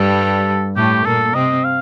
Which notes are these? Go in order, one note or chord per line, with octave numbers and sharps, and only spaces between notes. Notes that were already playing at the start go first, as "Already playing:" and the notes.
Already playing: G2 G3 A4
A2 A3 G4
A#2 A#3 A4
C3 C4 D#5
F5